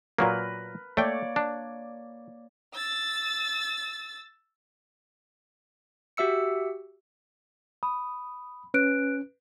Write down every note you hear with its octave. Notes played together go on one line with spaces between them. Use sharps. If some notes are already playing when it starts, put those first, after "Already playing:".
A#2 F#3 A#3 A#4 B4
A3 A#3 C#5 D5 G5
D4
E6 A6
F#4 G4 E5 E6 C#7
B5 D#6
C#4 B4 F#6 D7